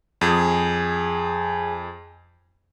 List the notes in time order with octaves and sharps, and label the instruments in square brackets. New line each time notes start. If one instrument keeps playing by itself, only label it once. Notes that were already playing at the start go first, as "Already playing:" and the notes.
[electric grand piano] F2 [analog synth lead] G#4